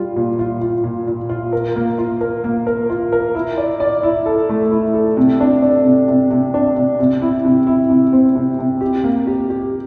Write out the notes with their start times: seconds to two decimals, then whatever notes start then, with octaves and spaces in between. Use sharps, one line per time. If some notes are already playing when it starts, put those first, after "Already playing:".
Already playing: G3 F4
0.16 A#2
0.39 F4
0.61 F4
0.84 A#2
1.07 A#2
1.29 F4
1.53 A#4
1.76 A#3
1.98 F4
2.21 A#4
2.44 A#3
2.67 A#4
2.90 F4
3.12 A#4
3.35 E4
3.57 D5
3.80 D5
4.03 E4
4.26 A4
4.49 A3
4.71 E4
4.94 A4
5.17 C3
5.40 D4
5.62 D4
5.85 C3
6.08 C3
6.31 C3
6.54 D4
6.76 C3
6.99 C3
7.22 E4
7.45 C3
7.67 E4
7.90 C3
8.13 C4
8.36 C3
8.59 C3
8.81 G4
9.04 A#3
9.27 G4
9.50 G4